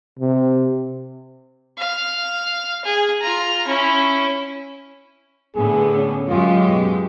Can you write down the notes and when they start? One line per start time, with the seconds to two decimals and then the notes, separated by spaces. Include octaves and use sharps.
0.19 C3
1.78 F5
2.85 G#4
3.21 F4 A#5
3.67 C#4 E4
5.56 A2 D3 B3 G#4
5.96 C#4
6.29 F#2 G#3 F4 G4
6.68 B2